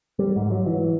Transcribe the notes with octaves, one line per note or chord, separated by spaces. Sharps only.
G3
G#2
F#3
E3